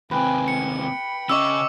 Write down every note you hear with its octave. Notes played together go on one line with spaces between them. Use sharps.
D#2 C3 B4 G5 G#5
C#7
G5 B5
C#3 C#4 D#5 E5 C#6 D6 E6